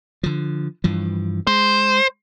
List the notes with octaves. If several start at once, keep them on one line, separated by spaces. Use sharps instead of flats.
D3 F3
G2 E3 F3
G#3 C5